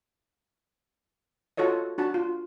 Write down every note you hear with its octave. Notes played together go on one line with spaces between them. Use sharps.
F4 F#4 A4 C#5 D#5
D4 F#4 A5
F4